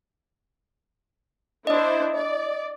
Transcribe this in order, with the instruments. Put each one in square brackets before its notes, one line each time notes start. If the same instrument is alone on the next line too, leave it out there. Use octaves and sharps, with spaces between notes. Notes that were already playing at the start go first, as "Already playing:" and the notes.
[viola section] D4 E4 C5 [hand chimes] D#5 D#6
[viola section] D5